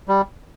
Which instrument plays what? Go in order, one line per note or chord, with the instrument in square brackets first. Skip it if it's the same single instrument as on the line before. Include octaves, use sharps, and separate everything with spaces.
[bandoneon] G3